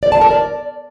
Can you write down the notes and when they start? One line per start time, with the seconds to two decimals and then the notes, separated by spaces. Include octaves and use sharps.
0.03 D5
0.12 A5
0.21 A#4
0.31 D5